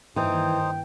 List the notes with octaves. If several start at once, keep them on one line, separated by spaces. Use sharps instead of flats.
G2 D#3 E3 A#3 D#4 C5 G5